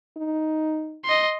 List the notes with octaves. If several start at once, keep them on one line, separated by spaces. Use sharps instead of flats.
D#4
D#5 C6